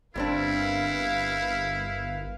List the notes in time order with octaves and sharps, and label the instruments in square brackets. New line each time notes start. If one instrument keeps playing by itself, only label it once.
[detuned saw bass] G1 [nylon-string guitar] G3 C4 D4 [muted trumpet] E4 [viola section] A#4 B4 F5